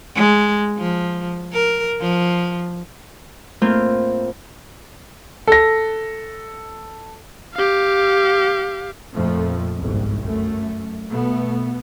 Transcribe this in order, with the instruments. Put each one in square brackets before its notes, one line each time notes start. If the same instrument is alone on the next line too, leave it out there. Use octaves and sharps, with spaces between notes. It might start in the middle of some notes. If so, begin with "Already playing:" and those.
[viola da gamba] G#3
F3
A#4
F3
[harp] A2 A#3 C4 F4 F6 G6
[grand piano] A4 A#6
[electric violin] G4 F5
[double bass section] F2 A#2 F3 A3
G1 C2 G#2
F#2 A3
B2 A3 B3